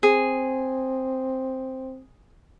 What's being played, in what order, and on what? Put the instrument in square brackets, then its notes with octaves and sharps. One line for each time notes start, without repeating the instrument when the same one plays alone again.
[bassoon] C4 [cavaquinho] G#4